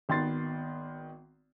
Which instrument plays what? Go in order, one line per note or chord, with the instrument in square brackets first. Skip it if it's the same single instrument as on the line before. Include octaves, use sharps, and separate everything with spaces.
[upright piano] G#1 D#3 B3 C6 A6 C7